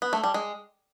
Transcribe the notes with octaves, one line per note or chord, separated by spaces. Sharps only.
B3
A3
G3
G#3